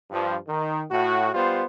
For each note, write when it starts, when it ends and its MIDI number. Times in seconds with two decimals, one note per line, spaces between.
0.10 0.37 43
0.10 0.37 53
0.48 0.84 51
0.90 1.33 45
0.90 1.33 66
1.34 1.63 55
1.34 1.63 59
1.34 1.63 65
1.34 1.63 72